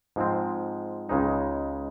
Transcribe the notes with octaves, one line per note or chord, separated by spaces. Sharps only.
G#2 F3 G#3 C4
C#2 C#3 G#3 D#4